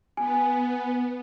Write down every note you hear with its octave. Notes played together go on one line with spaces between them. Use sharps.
B3 G#5